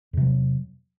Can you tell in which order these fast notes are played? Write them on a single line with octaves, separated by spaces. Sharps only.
E2 C3 F#3